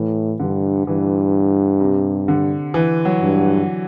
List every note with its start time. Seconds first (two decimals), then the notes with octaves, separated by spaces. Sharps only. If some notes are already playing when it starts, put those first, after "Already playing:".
Already playing: A2 E3
0.39 G2 D3
0.87 G2 E3
1.80 C3
2.28 D3
2.74 E3
3.05 F#3
3.21 G2